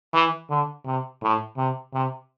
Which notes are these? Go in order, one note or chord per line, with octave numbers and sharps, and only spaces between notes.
E3
D3
C3
A2
C3
C3